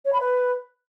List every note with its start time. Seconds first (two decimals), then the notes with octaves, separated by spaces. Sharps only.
0.04 C#5
0.12 B5
0.20 B4